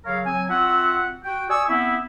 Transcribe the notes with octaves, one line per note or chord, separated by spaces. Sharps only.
C#3 F#3 A#4 C#5 F5
F#3 C4 G#5
C4 F4 F#4 E5 F#5
F#4 G5
D5 G#5 C#6 D#6 E6
B3 C4 E4